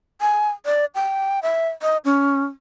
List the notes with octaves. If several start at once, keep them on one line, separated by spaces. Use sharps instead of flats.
G#5
D5
G5
E5
D#5
C#4